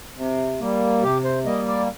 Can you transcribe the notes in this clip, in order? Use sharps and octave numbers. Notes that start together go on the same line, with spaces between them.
C3
G3 A#3
C3 G4
C5
G3 A#3 D#5
D5